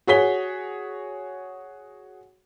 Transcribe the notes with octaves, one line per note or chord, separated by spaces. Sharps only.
F#4 G#4 C#5 B6 G7